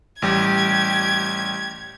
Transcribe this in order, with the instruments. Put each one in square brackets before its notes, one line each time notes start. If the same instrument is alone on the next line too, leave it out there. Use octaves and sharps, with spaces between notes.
[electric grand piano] A1 G3 [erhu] G4 [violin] G#6